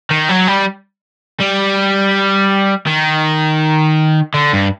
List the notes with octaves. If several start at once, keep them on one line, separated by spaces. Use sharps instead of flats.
D#3
F#3
G3
G3
D#3
D3
G2